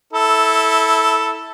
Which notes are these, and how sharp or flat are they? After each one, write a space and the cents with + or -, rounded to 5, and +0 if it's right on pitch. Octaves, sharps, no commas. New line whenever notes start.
E4 -15 A4 +0